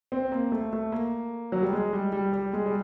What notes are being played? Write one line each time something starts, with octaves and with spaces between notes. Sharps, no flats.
C4
A#3
A3
A3
A#3
F#3
G3
G#3
G3
G3
G3
G#3
G3